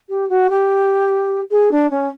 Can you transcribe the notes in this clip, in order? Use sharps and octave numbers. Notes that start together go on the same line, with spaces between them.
G4
F#4
G4
G#4
D4
C#4